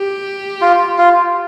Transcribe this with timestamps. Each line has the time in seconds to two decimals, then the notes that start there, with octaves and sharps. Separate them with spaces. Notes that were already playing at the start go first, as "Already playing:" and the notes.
Already playing: G4
0.61 F4
0.98 F4